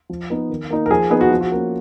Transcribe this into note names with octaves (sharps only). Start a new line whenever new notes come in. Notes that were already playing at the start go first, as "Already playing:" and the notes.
F3
B3 D#4
D#3
A#3 D#4
A#4
F3 G#4
B3 D#4 G#4
F#4
F3
F#4
A#3 C#4